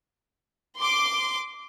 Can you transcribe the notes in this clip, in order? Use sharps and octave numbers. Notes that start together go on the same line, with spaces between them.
C6 D6